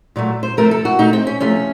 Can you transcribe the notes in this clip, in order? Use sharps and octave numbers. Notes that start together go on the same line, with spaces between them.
A#2 F#3 A3
C5
C3 F3 A3 A#4
A4
F#4
A#2 A3 D#4
C4
C#4
C3 F3 A3 C#4